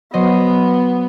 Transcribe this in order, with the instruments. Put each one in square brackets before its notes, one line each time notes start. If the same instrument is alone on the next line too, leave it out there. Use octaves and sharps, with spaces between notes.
[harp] F#3 C5 D#5 [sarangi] B3